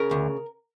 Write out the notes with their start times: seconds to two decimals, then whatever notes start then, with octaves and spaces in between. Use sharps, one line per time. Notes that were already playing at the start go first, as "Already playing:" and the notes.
Already playing: C#3 A#4
0.11 D2